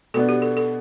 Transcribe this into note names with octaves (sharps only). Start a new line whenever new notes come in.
B2 B3 D4 A4
G4
A4
A4